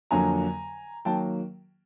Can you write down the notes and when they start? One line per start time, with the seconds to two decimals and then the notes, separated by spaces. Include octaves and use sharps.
0.11 F2 D3 F#3 A#3 G#5 A#5
1.05 D#3 F#3 A#3 G5 A5